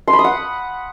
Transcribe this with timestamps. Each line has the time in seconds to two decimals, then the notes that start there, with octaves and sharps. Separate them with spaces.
0.08 C6
0.13 B5
0.19 D#6
0.24 F#5